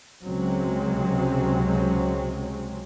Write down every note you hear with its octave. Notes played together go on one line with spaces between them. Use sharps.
C#2 C3 F#3 G#3 C4 C#4